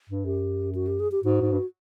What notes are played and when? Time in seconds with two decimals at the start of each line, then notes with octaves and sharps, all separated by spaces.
0.09 G2
0.25 F#2 G4
0.75 F#4
0.87 G4
1.00 G#4
1.12 G4
1.24 G#2 F#4
1.41 G#2
1.52 G2